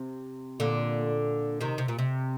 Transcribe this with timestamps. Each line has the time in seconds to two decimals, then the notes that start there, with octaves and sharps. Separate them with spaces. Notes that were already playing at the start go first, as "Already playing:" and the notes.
Already playing: C3
0.60 A#2 D3
1.61 C3 D#3
1.78 C3
1.88 A#2
1.99 C3